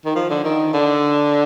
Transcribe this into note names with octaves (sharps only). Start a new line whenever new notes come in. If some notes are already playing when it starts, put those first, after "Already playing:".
D#3
F3
D3
D#3
D3